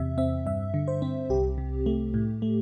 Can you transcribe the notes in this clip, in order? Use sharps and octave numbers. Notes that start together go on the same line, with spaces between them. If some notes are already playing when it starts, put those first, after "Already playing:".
Already playing: E2 C3 E5
C4 E5
G2 E5
D3
C5
C4
C2 G4
C3
A3
A2
A3